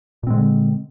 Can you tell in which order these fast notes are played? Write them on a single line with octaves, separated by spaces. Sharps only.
A#2 C4 G#3 D3